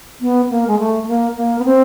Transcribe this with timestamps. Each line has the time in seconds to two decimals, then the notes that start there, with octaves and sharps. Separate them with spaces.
0.21 B3
0.50 A#3
0.67 G#3
0.79 A3
1.04 A3
1.08 A#3
1.37 A#3
1.59 B3
1.65 C4